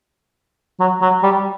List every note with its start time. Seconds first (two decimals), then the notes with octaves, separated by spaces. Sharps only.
0.80 F#3
1.02 F#3
1.23 G3